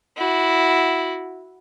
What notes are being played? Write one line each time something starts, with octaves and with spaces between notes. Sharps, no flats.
E4 F#4